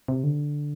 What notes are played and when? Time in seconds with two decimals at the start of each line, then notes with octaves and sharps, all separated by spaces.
0.08 C3
0.24 D3